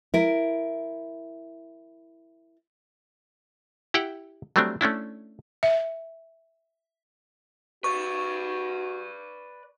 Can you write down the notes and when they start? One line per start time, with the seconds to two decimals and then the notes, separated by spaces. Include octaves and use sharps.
0.14 E4 A#4
3.94 E4 G4 F#5 G5
4.56 F#3 G3 A3 C4 D4
4.81 A3 C#4 D4 E4
5.63 E5
7.84 F#4 B4 D5 C#6